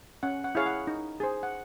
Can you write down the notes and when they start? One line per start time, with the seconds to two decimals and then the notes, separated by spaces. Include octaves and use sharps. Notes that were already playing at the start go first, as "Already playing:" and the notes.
0.23 C#4 F#5
0.44 F#5
0.55 E4 G#4 C#5 F5
0.66 F#5
0.87 D#4
1.20 G#4 C5
1.43 F#5